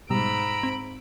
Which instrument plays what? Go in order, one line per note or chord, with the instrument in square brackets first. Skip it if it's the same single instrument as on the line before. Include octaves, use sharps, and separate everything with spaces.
[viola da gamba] G#2 [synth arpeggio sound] B2 G3 [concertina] A#5 E6 [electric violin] B5 D7
[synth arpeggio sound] C4 C5